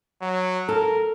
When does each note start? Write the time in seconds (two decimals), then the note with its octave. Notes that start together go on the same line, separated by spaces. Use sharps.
0.22 F#3
0.69 A4 A#4